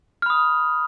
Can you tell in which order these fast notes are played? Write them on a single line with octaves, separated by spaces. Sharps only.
F6 B5 D#6